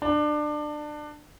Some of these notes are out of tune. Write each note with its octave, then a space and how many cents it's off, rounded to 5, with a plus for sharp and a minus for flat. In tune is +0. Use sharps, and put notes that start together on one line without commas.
D4 +25